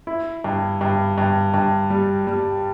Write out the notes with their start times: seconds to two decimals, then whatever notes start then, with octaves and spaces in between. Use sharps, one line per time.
0.07 E4
0.44 G2
0.81 G2
1.18 G2
1.54 G2
1.90 G3
2.27 G3